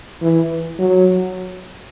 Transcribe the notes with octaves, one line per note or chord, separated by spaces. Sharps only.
E3
F#3